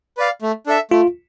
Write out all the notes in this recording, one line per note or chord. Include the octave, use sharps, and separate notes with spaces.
B4 D5 F5
A3
D4 A4 E5
A3 F4